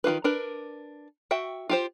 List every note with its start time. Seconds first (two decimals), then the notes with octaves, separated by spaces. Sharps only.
0.04 D#3 F3 F4 B4
0.24 D4 A#4 B4
1.31 F#4 E5 G5
1.70 F4 G4 C5